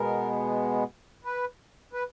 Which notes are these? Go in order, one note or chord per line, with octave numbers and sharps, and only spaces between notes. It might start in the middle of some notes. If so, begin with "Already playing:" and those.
Already playing: B2 G#3 B3 A#4
B4
B4